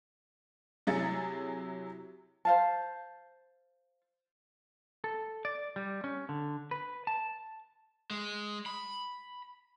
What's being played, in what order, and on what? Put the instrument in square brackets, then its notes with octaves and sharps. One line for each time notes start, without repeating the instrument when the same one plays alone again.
[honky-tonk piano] C3 F#3 E4 G#4 A6 C#7
[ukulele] C5 F5 A5
[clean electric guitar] A4
D5
G3
C#4
D3
B4
A5
[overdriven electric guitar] G#3
B5